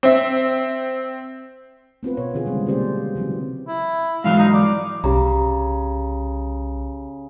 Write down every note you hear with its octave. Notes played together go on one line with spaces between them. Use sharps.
C4 E5
B3 C4 F4 B4
B2 B3 C#5
B2 D3 E3 F4 G#4
C#3 E3 G3 G#3 C4
C3 A#3 C#4 G4 C5 D5
C#3 E3 F#3 C4
E4
G#2 E3 F#3 F5
D#4
D5
C2 C#3 G4 A#5